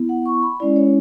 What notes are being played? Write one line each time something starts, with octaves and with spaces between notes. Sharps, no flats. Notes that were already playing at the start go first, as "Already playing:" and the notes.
Already playing: B3 E4
F#5
C#6
B5
G#3 C#4 E4 D5
C#5